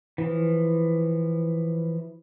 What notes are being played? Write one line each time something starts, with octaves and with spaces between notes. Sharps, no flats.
E3 F3